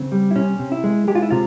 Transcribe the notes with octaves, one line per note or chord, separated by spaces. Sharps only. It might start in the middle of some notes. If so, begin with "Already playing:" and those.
Already playing: C#3 C4
G3
E4
C3 C#4
C3
E4
G#3
G#3 G4
F4
E4
C3 F4